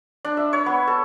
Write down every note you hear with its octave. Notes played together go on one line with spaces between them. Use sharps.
D4
E5
C#5
B3
A4